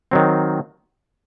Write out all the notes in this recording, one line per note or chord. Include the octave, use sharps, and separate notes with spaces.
D#3 F#3 C4